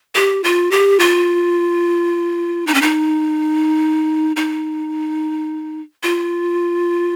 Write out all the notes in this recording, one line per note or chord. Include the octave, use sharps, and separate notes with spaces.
G4
F4
G4
F4
D#4
C#4
D#4
D#4
F4